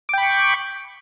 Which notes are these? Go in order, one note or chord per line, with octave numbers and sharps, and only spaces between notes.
G5 B5 C#6 D6